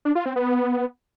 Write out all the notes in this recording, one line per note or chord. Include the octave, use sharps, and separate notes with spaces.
D4
F4
C4
B3